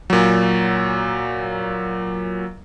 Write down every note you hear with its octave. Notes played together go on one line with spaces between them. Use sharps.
A#2 F#3